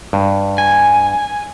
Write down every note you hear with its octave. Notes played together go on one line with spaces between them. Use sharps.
G2
G#5